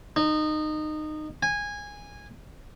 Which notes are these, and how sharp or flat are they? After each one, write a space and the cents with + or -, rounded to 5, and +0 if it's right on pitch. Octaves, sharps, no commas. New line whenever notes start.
D#4 -20
G#5 -15